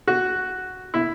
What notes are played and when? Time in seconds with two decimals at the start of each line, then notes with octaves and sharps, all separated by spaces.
0.08 F#4
0.94 E4